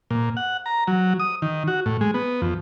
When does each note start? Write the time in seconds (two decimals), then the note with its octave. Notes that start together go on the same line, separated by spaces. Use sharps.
0.11 A#2
0.37 F#5
0.66 A#5
0.87 F#3
1.20 D#6
1.42 D#3
1.68 F#4
1.86 A2
2.01 G#3
2.14 B3
2.42 F2